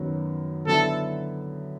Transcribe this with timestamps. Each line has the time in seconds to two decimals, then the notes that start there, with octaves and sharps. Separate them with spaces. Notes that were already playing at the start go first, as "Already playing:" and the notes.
Already playing: F#2 D#3 F#3 B3
0.67 D3 F#3 B3 E4 A4